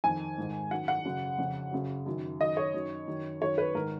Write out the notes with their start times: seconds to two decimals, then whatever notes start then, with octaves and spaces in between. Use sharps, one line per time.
0.04 F2 D#3 G#5
0.38 G#2 D#3
0.71 F#2 D#3 F#5
0.88 F#5
1.05 F#2 C#3
1.38 F2 C#3
1.72 F#2 C#3
2.06 F#2 D#3
2.40 F#2 D#3 D#5
2.57 C#5
2.74 F#2 D#3
3.08 F#2 D#3
3.41 F#2 D#3 C#5
3.58 B4
3.74 G#2 D#3 A#4